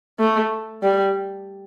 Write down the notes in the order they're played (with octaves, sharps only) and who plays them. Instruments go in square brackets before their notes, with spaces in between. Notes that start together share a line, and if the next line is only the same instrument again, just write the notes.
[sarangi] A3
G3